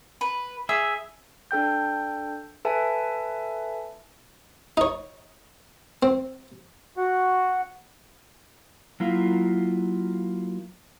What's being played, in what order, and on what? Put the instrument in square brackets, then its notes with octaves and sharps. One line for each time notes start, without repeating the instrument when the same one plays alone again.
[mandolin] B4
[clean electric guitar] G#4 E5 [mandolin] E6
[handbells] D4 A4 G5 G6
A4 B4 E5 G#5 A5
[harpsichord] D#4 C#5
C4
[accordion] F#4 F#5
[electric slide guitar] F#3 A#3 E4 F4